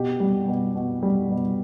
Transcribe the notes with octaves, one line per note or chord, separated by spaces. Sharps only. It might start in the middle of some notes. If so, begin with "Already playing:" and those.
Already playing: B2 G4
G3
B2
B2
G3
B2